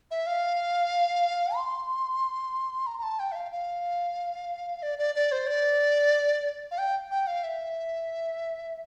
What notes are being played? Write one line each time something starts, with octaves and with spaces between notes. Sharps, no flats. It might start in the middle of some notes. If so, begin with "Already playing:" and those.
E5
F5
C6
A#5
A#5
A5
G5
E5
F5
F5
D5
D5
D5
C5
D5
F5
G5
G5
F5
E5